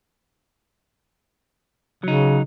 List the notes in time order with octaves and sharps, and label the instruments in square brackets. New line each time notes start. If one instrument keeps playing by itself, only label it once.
[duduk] C#3 [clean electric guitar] F#3 D#4